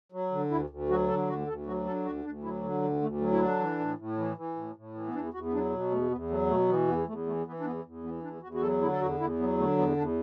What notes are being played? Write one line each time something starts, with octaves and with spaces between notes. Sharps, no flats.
F#3
D3
D2 E4
D2
F#3 F#4
D3 A4
D2 F#4
D2 A4
F#3 F#4
D3 A4
D2 F#4
D2 D4
F#3 E4
D3
D2
D2 A3
F#3
E4
D3 D4
E3
A2
A2
E3
E3
A2
A2
E3
B3
E2 D4
E2 F#4
B3
F#3 D4
B2
E2 A3
E2 B3
F#3 A3
B2 A3
E3 B3
E2 B3
E2 A3
E3 A3
E3 B3
D4
E2 B3
E2
E3 B3
E2 D4
E2 F#4
F#4
F#3 A4
D3 E4
A4
E2 F#4
E2 E4
F#3 B3
D3 A3
E2 B3
E2 D4